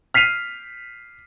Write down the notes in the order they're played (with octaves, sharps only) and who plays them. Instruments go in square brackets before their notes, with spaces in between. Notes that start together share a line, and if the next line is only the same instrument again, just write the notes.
[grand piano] F6 B6 C7 D#7 F7